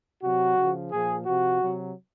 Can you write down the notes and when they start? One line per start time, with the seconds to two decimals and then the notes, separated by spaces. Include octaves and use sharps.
0.23 C3 F#3 F#4
0.58 C#3 F3
0.92 A#2 F3 G#4
1.26 C3 F3 F#4
1.61 C3 F#3